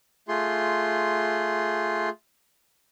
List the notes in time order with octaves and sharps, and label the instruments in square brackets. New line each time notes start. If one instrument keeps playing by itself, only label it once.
[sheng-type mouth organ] A3 F4 G#4 C6